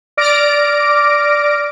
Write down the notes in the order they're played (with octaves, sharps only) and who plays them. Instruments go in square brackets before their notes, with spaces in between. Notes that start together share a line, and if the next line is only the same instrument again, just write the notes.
[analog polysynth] D5 D6 F6 A#6 D7